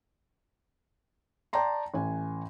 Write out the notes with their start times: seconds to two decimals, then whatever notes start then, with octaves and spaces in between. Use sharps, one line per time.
1.53 D5 G5 A5 A#5 C6
1.94 A1 G#5